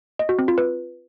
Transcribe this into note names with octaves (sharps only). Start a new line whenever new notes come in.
D#5
F#4
C4
F4
B4